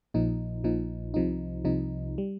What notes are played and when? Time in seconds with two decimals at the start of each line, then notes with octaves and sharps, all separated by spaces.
0.14 A#1 A#2 F3 D#4
0.64 A#1 A#2 F3 D#4
1.14 C2 C3 F3 D#4
1.65 C2 C3 F3 D#4
2.18 G3